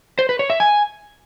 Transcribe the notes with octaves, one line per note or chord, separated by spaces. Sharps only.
C5
B4
C#5
E5
G#5